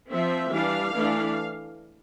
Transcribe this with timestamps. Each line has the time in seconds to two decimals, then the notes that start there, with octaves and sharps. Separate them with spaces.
0.09 F3 C4 E5
0.51 E3 G3 D4 F5
0.94 E3 A3 D4